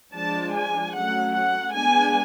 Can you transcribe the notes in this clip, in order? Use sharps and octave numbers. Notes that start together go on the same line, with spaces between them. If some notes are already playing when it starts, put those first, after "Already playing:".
F3 G#3 D4 A5
G#5
F#3 A3 C#4 F#5
F#5
G#3 B3 D4 G#5